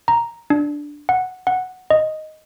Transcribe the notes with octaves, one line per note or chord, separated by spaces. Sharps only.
A#5
D4
F#5
F#5
D#5